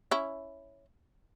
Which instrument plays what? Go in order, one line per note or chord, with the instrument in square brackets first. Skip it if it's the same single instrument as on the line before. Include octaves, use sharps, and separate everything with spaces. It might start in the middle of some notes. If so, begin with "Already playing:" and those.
[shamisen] C#4 E4